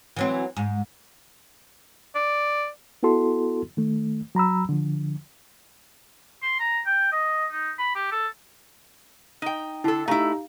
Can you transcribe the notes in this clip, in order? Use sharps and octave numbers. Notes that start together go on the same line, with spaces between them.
E3 F#3 C4
G#2
D5
B3 E4 F#4 A4 C6
D#3 A3
F#3 A#5 B5 E6
D3 F3
C6
A#5
G5
D#5
D#4
B5
G4
A4
D#4 G5
D3 E4 A4 A5
A3 D#4 E4 G4 F5 A#5